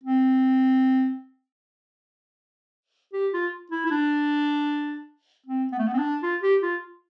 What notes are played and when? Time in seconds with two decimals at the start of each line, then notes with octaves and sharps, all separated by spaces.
0.04 C4
3.13 G4
3.33 F4
3.71 E4
3.86 E4
3.91 D4
5.46 C4
5.72 B3
5.79 A3
5.87 B3
5.93 C4
5.98 D4
6.23 F4
6.43 G4
6.63 F4